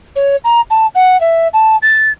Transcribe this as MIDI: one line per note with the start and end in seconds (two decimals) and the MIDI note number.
0.16 0.36 73
0.44 0.60 82
0.70 0.86 81
0.95 1.19 78
1.20 1.47 76
1.53 1.76 81
1.82 2.09 93